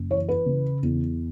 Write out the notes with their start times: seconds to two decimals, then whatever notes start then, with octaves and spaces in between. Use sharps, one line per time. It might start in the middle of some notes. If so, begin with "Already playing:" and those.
Already playing: F#1
0.10 E3 C#5
0.28 B4
0.46 C#3
0.83 E2